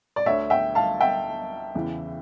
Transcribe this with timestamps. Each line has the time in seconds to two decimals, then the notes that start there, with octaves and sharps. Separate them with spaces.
0.16 D5
0.26 D2 D3 C#5 E5
0.50 E5 G5
0.75 F5 A5
1.01 E5 G5
1.75 E2 C#3 E3